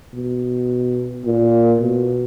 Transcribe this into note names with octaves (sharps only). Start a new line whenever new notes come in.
B2
A#2
B2